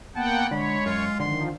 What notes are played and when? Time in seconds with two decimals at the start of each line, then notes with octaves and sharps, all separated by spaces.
0.16 A#3 B3 F#5 G5 A5
0.51 D3 G#3 C#5 B5
0.86 F#2 F4
1.20 D3 D#3 F3 C6